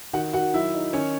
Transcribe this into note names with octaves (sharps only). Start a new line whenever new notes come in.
D#3 F#4 F#5
D#3 F#4 F#5
F#3 E4 E5
D#4
D#3 C#4 C#5